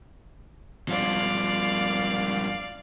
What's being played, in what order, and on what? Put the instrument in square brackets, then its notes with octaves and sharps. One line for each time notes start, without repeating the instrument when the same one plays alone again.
[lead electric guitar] G2 F3 [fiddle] D5 F5